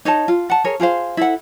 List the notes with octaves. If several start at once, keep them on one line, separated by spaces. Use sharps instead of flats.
D#4 C#5 D#5 A5
F4
F#5 A5
G#4 A#4 C#5
F4 G#4 C5 F5
E4 A4 F#5